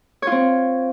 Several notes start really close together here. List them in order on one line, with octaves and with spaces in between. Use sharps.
C#5 F4 C4